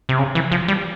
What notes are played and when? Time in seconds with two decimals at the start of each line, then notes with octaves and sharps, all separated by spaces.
0.09 C3
0.19 C#3
0.35 E3
0.52 F3
0.68 G3